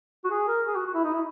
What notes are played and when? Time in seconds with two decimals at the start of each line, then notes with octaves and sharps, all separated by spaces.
0.25 F#4
0.31 G#4
0.48 A#4
0.67 G#4
0.76 F#4
0.86 F#4
0.94 E4
1.04 D#4
1.13 E4